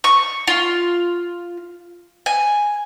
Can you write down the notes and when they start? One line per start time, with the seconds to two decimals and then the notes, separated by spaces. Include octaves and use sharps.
0.04 C#6
0.47 F4
2.26 G#5